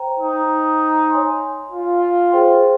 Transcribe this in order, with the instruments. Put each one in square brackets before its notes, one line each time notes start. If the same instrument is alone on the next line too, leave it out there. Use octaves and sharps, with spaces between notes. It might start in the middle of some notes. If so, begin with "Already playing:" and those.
Already playing: [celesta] C5 G5 A#5
[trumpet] D#4
[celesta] C#5 G#5 C6
[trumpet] F4
[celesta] G#4 C5 G5 C6